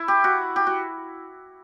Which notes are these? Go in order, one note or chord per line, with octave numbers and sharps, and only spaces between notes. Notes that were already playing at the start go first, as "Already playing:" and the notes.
Already playing: E4
G4
F#4
G4
F#4